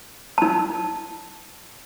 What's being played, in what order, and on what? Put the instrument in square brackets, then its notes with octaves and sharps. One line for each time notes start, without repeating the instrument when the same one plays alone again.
[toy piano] D#4 A5